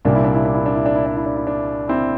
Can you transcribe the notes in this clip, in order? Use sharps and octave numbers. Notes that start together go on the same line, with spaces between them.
C2 A#2 G3 A#3 D4
E4
D4
E4
D4
E4
D4
E4
D4
E4
D4
E4
D4
E4
D4
C4 E4